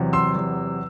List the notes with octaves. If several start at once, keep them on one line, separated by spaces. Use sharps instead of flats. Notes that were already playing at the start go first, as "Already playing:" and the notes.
Already playing: E2 C3 F#3
C6 E6
E2 C3 F#3